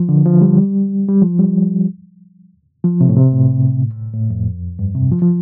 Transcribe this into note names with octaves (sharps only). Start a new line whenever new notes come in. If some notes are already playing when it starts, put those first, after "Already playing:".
Already playing: F3
D3
F3
G3
G3
F3
G3
F3
C3
A2
C3
A2
A2
F2
G2
C3
F3
F3